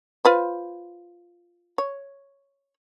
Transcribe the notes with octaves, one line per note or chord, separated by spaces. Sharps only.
F4 B4 C5
C#5